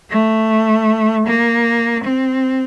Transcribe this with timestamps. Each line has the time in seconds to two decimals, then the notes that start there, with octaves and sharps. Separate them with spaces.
0.10 A3
1.27 A#3
2.04 C4